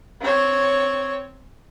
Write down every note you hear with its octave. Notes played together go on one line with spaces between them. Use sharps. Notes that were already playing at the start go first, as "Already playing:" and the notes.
C4 C#5